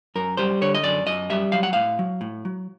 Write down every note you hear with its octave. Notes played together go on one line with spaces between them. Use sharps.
F#2 A#4
G3 C5
D3 C#5
D#5
F#2 D5
F#2 D#5
G3 E5
F#3 F5
F#5
A2 F5
F#3
A2
F#3